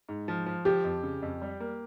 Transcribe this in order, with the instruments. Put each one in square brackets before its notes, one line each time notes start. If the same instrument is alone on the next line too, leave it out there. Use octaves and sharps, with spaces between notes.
[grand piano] G#2
F3
F3
[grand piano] F3 [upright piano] G4
[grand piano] F2
C#3
F2
G3
A#3